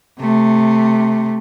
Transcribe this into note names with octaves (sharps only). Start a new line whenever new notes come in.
C3 A3